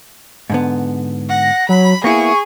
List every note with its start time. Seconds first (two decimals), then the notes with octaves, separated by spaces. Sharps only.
0.50 G#2 D3 B3
1.29 F#5 A#6
1.69 F#3 B5
2.04 A#3 B3 E4 G#4 C#6